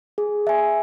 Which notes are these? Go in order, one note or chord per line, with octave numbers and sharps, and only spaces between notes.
G#4
E5 G#5